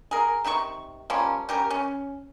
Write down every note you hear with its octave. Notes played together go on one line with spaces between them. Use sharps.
G#4 A#4
C3 D#3 D#4 C#6
F3 G3 A#3 C#4
C#4 G4 A#4
C#4